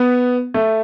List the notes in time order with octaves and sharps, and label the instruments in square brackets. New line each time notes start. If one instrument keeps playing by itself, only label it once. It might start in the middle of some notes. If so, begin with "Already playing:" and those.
Already playing: [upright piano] B3
A3